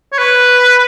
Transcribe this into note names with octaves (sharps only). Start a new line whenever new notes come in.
C#5
B4